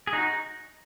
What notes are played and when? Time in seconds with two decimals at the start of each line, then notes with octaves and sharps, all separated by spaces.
0.07 G#4
0.13 D#4 F#4